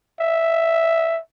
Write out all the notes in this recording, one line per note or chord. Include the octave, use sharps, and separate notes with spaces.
E5